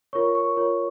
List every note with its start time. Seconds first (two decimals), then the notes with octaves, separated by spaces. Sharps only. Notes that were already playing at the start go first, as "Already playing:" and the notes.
0.13 F4 A#4 C#5 C#6
0.35 C#6
0.57 F4 A#4 C#5